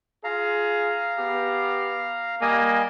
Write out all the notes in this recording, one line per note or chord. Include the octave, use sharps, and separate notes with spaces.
F4 G#4 F5 A#5
B3 G4
G3 A#3 D#5 G#5